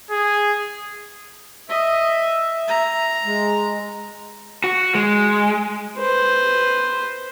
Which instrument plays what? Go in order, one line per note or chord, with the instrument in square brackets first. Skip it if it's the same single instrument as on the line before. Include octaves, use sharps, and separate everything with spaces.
[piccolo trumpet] G#4
[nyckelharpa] D#5 [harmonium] E5
[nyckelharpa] A#5
[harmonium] G#3
[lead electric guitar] F#4
G#3
[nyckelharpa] B4 C5